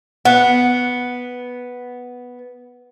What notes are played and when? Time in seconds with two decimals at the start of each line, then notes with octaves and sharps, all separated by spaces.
0.25 B3 F#5